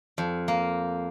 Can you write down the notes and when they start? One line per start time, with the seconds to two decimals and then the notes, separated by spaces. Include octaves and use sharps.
0.18 F2
0.48 A#3